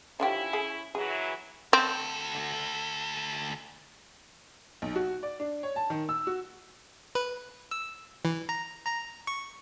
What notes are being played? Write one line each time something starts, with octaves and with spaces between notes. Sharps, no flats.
D3 F3 C#4 E4 G4
G#4
E3 F#3 E4 G#4
D2 C4 A4
B1
F#4
D5
D4
C#5
A5
D#3
E6
F#4
B4
E6
E3
A#5
A#5
C#6